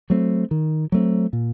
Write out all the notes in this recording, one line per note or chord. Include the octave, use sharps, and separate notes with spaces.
F#3 A3 C4
D#3
F#3 A3 C4
A#2